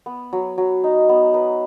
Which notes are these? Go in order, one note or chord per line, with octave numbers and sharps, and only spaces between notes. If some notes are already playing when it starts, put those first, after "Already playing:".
B3
F#3
F#3
D#4
B3
B4